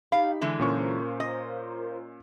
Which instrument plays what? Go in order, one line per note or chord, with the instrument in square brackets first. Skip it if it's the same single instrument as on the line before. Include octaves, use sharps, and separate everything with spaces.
[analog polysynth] D#4 G4 [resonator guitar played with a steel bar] F5 [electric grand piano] B5
[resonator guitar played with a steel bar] D3 E3 G#3
[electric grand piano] A#2 C#4 C#6 [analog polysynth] F4 A#4 C5
[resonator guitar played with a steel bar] D#5